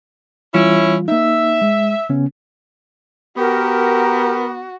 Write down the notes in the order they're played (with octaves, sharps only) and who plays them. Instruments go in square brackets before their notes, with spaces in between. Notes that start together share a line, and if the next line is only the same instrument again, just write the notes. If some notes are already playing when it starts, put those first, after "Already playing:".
[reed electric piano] E3 G3 F4 [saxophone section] C#4 E4
[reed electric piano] A#3 D#4 [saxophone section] E5
[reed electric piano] G#3
C#3 B3 C#4
[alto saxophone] B3 [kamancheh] F#4 [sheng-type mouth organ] G4 [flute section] A#4